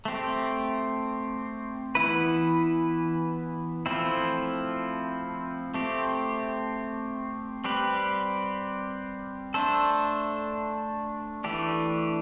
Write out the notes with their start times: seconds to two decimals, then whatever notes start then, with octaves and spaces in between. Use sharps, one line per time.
0.05 A3 C4 G4
1.95 E3 B3 E4 B4
3.86 F3 A3 C4 E4
5.74 A3 C4 G4
7.64 G3 C4 G4 B4
9.54 A3 D4 A4 C5
11.44 E3 A3 D4 G4